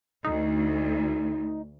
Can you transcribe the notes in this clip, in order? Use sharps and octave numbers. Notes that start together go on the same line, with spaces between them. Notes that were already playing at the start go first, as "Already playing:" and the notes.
D2 D#4